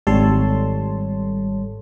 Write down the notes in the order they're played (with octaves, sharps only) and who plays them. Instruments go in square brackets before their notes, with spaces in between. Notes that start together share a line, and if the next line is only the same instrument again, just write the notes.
[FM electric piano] G#1 G3 A4 C#5 A5 C6